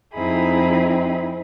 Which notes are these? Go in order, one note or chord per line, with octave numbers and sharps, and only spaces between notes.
F2 C4 D#4 E4 G#4 B5